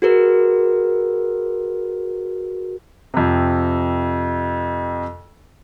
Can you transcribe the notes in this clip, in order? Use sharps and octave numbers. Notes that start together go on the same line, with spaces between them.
F#4 G#4 A#4 B4
F2 C3